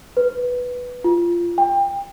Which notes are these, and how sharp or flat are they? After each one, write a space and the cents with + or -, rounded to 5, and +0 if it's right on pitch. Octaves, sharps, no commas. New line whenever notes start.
B4 +0
F4 -15
G5 +25